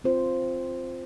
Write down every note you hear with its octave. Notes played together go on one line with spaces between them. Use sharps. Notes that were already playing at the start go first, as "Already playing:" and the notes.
C4 F4 C5